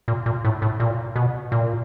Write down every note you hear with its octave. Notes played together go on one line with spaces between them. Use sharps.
A#2
A#2
A2
A2
A#2
B2
A#2